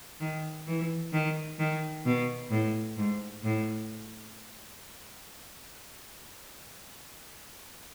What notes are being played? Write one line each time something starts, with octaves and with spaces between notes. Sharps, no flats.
D#3
E3
D#3
D#3
B2
A2
G#2
A2